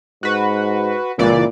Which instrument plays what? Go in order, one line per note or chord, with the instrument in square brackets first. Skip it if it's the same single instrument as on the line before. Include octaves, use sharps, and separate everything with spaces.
[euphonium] G#2 [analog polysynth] F#4 B4
[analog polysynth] C#2 E3 D5 [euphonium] A#2